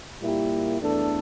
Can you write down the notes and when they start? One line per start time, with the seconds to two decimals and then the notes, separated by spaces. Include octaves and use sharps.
0.20 A#2 G3 A#3 E4 G4
0.79 E2 E3 A3 D4 A4